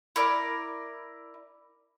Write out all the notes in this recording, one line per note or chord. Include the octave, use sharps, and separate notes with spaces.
E4 A#4 D5